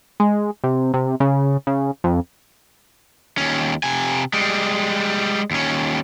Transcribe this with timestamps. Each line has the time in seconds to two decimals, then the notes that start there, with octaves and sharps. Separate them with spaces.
0.20 G#3
0.64 C3
0.94 C3
1.20 C#3
1.67 C#3
2.04 F2
3.38 D#2 C#4
3.83 C3 G#5
4.33 G3 G#3
5.51 D#2 C#4